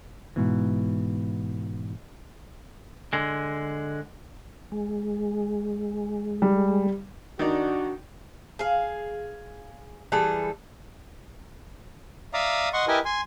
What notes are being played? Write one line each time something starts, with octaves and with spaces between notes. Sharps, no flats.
G#2 B2 E3
D3 G#3
G#3
G3
D#3 D4 D#4 F#4 D5
G#4 F5
E3 G3 G#4 A4
D5 E5 F5 A#5 D#6
D#5 F#5 C6 C#6
E4 G4 A#4 B4 D#5 G#5
G#5 C6